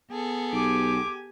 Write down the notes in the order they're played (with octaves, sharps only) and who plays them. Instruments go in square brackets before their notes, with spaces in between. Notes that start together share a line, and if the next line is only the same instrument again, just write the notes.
[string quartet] B3 G#4 A4
[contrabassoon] B1 [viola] G4 G#5 [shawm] D6